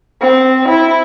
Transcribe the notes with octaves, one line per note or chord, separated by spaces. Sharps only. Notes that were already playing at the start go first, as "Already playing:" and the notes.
C4
E4